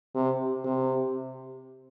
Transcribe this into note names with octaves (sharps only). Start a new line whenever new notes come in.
C3
C3